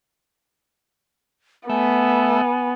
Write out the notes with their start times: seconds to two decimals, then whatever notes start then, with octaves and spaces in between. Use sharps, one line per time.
1.69 A3 B3 E5 G#5